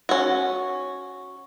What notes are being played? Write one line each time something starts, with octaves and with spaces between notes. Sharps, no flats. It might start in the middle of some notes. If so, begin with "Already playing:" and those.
C#4 F#4